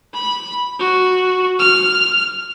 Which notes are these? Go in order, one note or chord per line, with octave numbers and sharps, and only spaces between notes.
B5
F#4
F6